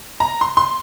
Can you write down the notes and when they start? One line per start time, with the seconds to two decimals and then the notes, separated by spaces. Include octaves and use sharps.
0.20 A#5
0.41 C6
0.57 C6